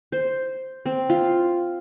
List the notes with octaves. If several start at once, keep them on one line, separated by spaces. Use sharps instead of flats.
C5
C4
F4